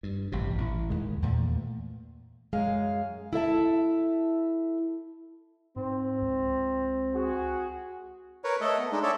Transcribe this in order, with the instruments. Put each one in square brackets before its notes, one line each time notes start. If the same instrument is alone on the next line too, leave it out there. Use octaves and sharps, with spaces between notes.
[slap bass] G2
A1 G2 C3
A1
D#2 D#3 G#3
E2 A#2 A3
[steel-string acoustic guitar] F#2 G#3 G#4 F5
E4 A4 E5 A5
[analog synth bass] G#2 [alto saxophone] C4
[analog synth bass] C#2
[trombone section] F#4 G#4
[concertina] A#4 B4 C#5
A3 A4 D#5
B3
G#3 D4 D#4
A4 C#5 D5 E5